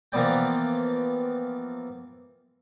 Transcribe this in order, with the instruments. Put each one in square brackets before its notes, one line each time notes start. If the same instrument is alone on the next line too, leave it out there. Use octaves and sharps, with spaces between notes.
[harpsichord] E3 F3 A#3 B3 D5 G5